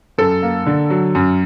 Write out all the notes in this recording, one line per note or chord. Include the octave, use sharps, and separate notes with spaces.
F#2 A4
A#3
D3
F#3
F#2